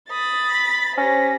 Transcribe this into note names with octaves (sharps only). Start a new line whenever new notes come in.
B5 D#6 A6
B6
C#4 G4 C5 A#6